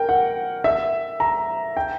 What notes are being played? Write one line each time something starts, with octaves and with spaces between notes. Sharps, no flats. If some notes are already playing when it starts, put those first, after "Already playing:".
Already playing: A#4 G5
F#5
E5
A#5
G5